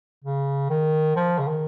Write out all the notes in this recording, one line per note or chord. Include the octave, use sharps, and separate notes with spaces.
C#3
D#3
F3
C#3
D#3